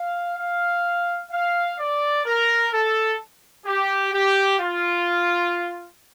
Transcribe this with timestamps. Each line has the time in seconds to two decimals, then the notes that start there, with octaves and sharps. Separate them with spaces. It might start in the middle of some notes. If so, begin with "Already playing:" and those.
Already playing: F5
0.37 F5
1.31 F5
1.78 D5
2.25 A#4
2.72 A4
3.66 G4
4.13 G4
4.60 F4